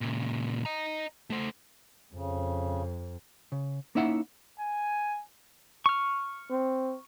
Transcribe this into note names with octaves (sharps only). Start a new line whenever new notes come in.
A#2 C#3
D#5 A#5
A3 C5
F2 C#3
C#3
A#3 C#4 D#4 E4 E5 F#5
G#5
C#6 F6
C4